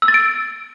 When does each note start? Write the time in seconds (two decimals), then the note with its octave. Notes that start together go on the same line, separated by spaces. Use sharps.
0.02 E6
0.08 A6
0.14 D7